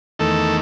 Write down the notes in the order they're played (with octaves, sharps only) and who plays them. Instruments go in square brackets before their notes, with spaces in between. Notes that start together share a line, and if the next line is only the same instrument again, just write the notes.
[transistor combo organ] E2 D#3 A3 A4